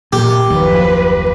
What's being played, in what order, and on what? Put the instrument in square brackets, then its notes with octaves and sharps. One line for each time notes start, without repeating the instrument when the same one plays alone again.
[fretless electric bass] A#2 [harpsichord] G4
[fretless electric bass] F#1 D#2 [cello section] F3 B4